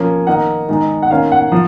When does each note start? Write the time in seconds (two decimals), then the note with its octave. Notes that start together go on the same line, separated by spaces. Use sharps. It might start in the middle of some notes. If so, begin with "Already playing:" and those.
Already playing: F3 A#3 C#4
0.27 D#3 A#3 D#4 F#5
0.69 D#3 G#3 D#4
1.03 F#5
1.10 D#3 A#3 C#4 F5
1.32 F#5
1.52 F3